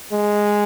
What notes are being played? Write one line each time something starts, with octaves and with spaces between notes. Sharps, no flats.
G#3